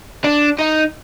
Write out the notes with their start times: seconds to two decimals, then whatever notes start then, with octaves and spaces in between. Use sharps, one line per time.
0.24 D4
0.59 D#4